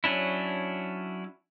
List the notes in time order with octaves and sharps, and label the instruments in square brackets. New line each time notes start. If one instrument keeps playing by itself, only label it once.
[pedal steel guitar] F#3 C#4 D4 E4